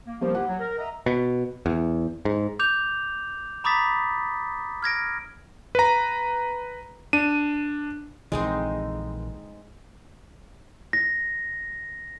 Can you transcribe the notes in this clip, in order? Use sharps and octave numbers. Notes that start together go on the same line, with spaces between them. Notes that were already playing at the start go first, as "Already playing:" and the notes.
A#3
F3 G3 A#3 C5
E4 F4 G4 F#5
F#3
A#4
D#5 E5 A#5
B2
E2
G#2
D6 G6 F7
A#5 B5 D6 D#6 A6 B6
F6 G#6 A#6 D7
B4 A#5
D4 D#7
A#1 D3 E3 G#3 C4 D#4
A#6